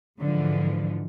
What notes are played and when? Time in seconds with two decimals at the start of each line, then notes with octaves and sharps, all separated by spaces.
0.20 G#2 D3 E3 F3